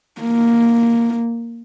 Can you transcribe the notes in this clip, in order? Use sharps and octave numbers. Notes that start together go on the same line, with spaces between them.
A#3